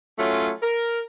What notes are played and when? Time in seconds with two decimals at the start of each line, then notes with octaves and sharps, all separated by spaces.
0.19 F#3 A3 C#4 F4
0.63 A#4